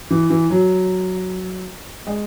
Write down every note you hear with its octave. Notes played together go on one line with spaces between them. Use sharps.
E3
E3
F#3
G#3